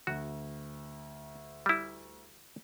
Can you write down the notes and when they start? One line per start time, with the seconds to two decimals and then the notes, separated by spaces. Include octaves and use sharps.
0.07 D2 F#4
1.66 G3 E4